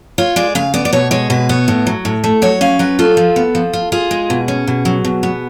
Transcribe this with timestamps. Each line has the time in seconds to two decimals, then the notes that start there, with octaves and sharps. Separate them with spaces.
0.18 F4 C#5
0.36 G#3 D5
0.55 C#3 F5
0.74 B3 D5
0.85 D5
0.93 B2 C#5
1.11 G#3 C#5
1.30 B2 B4
1.49 B3 C#5
1.68 A2
1.87 F#3
2.05 A2
2.24 A3
2.42 F#3 C#5
2.61 C#4 F5
2.79 F#3 B4
2.99 F4 A4
3.17 F3
3.36 B3
3.55 F3
3.73 F4
3.92 F4 G#4
4.11 G#3
4.30 B2
4.48 C#4
4.67 B2
4.85 F#3
5.05 B2
5.23 B3